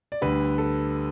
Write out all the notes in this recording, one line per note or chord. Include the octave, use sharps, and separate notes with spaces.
D5
D2 D3 G3 B4
A4